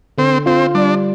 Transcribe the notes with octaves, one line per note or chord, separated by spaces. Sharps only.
D3 C4
C4 F4
G3 D4